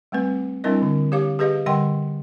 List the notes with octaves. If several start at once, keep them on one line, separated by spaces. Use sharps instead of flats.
G3 A3 C4 B4
G3 C4 D4 E4 A#4 D#5
D3
G4 C#5 F5 D6
G4 G#4 B4 D#5 F5
D3 G3 D#5 F#5 G5 C6